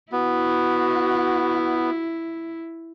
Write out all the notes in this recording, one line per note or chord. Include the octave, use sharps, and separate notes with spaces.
B3 E4 F#4